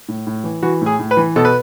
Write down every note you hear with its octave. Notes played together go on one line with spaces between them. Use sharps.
A2
A2
E3
E3 F#4
A2 G#4
A2
B4
E3
B2 A4
B4